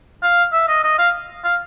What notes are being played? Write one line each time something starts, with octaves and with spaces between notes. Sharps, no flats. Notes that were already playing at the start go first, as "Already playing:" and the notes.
F5
E5
D#5
D#5
F5
F5